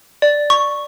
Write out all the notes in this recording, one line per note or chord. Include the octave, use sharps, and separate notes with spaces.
D5
C#6